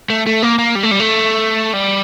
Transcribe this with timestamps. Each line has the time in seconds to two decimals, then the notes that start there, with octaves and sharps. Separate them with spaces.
0.10 A3
0.26 A3
0.42 A#3
0.58 A#3
0.75 G3
0.83 A3
0.91 G3
1.00 A3
1.73 G3